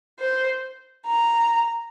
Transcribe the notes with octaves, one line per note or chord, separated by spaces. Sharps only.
C5
A#5